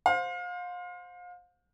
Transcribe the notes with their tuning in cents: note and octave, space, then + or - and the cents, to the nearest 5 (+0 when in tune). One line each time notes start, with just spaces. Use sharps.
C5 +0 F5 +35